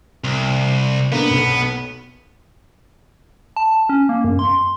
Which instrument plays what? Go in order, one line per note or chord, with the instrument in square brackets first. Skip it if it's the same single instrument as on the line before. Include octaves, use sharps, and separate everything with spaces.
[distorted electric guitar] C2
[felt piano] D3 A#3 [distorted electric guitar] B3
[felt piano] B1
[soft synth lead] A5
C#4
A#3
F#2
C6